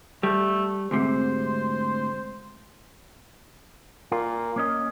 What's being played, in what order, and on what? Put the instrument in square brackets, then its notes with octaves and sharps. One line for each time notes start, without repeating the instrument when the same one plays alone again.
[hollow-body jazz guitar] G3 [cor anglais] A3
[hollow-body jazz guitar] D2 G#2 C3 [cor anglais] C5
[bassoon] A#2 [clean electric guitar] F4
[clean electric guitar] A#3 C#4 D#5